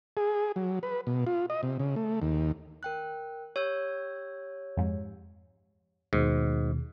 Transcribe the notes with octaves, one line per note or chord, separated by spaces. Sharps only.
G#4
F#3
B4
B2
F4
D#5
C3
C#3
A3
D#2
A#4 G5 F#6
G4 C#5 E6 G6
F2 G#2
D#2 G#2 B2 D#3